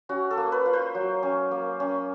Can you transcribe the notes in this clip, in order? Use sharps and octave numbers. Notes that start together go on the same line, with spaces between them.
C#4 F#4
A4
A#3
B4
F4
C5
F#3
C#4
A#3
C#4